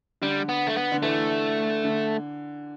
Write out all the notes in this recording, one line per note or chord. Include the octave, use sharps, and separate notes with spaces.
D3 G3
B3
A3
B3
D3
E3 A3
D3